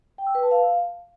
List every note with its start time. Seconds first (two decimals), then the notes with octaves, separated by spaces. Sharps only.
0.18 G5
0.27 E6
0.35 B4
0.43 A5
0.51 F5